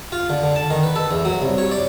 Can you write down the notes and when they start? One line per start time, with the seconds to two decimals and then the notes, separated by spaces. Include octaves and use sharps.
0.12 F4
0.30 D3
0.43 D3
0.56 A5
0.70 D#3
0.83 B4
0.96 A4
1.11 E2
1.25 F#3
1.42 C2
1.58 C#5
1.71 D5